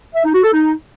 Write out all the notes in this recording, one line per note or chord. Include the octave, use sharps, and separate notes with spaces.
E5
D#4
F#4
A4
D#4